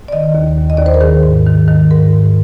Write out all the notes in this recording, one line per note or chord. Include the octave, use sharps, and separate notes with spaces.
D5
D#3 D#5
D#2
D#2
D#5
D#2 D5
C5
A#4
D#3 G#4
G#2
D#3
D#3
G#2 A#4
G#2